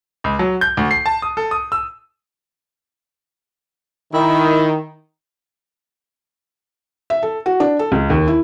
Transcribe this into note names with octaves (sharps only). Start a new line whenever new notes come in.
C#2
F#3
G6
D2
C7
A5
D#6
A4
D#6
E6
D#3 E4
E5
A4
F#4
D4
A4
C#2
D#2
E4